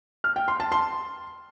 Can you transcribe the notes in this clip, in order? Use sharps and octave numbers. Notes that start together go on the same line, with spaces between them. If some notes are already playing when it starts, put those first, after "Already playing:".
F6
G5
C6
A5
C6